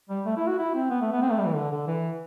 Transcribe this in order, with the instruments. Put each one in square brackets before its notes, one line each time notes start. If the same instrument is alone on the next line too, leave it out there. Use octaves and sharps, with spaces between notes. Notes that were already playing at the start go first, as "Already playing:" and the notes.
[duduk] G3
A3
E4
F#4
E4
C4
B3
A3
B3
C4
A3
G3
E3
D3
D3
E3